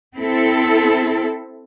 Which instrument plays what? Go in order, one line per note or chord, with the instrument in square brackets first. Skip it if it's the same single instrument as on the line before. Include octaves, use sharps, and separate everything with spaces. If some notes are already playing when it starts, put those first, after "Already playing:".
[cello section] C4 E4 A4